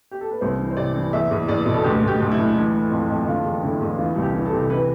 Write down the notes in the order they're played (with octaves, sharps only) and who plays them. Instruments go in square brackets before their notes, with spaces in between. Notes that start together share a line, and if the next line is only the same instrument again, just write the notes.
[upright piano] G4
A4
B4
C2 C5
E3
C5
C3 D5
E3
E2 E5
E2
E2 D5
B2
A4
D2 G4
D2
G4
D2
E4
D2
E3
E3
F2
F2
D3 F4
E2
D3 E4
E2
E3 F4
C2
G4
E3
A4
C3
E3 B4